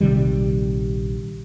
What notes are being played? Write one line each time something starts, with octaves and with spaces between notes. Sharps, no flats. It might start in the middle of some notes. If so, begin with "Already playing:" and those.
A#1 C3 D#3 G3